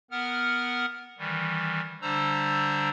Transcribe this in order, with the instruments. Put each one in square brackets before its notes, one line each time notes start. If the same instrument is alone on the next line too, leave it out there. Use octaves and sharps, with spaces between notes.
[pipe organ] B3 A#4 F#5 F6
D#3 E3 G3
D3 G3 D4 C5 A#5 E6